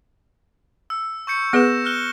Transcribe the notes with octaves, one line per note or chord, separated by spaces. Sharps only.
E6
C#6 G6 C#7
B3 G#4 B4 A#6 E7
F6 F#6 G7